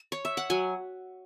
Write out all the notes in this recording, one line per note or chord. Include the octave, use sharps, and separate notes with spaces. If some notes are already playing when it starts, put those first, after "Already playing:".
Already playing: B4
C#5
E5
F#5
F#3 G#5